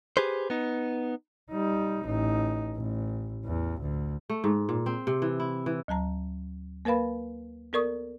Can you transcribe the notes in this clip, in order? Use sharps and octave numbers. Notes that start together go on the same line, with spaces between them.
G4 G#4 B4 C5
B3 D#4
G3 D#4
A1 D#4
A1
E2
D2
A3
G#2
A#2
C4
C3
E3
E4
E3
D2 F#3 A5 A#5
A#3 A#4 B4 F5 B5
B3 A4 A#4 D5 C#6 D#6